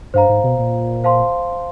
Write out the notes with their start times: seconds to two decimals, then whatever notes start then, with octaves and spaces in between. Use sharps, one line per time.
0.14 G2 C5 F5 A#5
0.29 G#2
0.44 B2
0.59 A#2
1.04 C5 F5 A5 C6